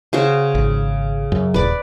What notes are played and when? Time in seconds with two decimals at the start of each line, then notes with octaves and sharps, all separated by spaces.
0.13 C#3 F#4 C5
0.55 G#1
1.32 F#2
1.54 D#1 B4 D5